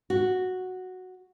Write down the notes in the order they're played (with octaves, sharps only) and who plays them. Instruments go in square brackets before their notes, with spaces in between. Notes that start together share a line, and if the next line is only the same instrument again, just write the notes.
[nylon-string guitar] F#4